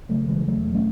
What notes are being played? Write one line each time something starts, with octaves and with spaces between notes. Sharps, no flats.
C#3 F#3 A3
C#3 E3 G#3
E2 F#3 A3
B2
A3 C#4